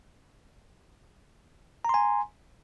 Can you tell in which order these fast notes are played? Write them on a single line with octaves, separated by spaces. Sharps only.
A#5 C6 G#5